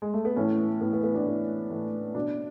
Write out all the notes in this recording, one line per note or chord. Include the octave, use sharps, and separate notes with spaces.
G#3
A3
B3
A2 E3 C#4
A2 E3 B3
B3
B3
D4
A2 E3
A2 E3
B2 D4